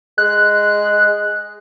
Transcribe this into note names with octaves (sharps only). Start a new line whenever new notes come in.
G#3 F#6